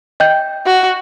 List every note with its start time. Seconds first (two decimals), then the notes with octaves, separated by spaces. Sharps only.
0.20 D#5 G5 G6
0.66 F#4